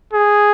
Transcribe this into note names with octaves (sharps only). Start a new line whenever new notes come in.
G#4